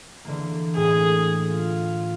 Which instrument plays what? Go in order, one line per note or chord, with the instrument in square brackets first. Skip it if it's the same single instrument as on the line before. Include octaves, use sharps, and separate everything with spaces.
[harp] D3 E3 A#3
[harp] A2 [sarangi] G#4
[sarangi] F4